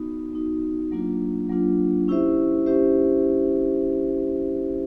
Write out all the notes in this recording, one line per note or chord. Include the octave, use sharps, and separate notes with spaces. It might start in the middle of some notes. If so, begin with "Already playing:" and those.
Already playing: B3 D#4 F#4
B3 D#4 F#4
F#3 A#3 D4 F4
F#3 A#3 D4 F4
C#4 E4 G4 C5 E5
C#4 E4 G4 C5 E5